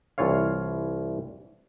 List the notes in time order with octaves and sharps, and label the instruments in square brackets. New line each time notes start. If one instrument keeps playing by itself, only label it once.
[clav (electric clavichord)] C2 E3 F4 C#5 F5